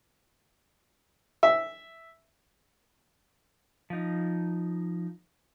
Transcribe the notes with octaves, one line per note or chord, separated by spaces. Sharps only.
E5
F3 D#4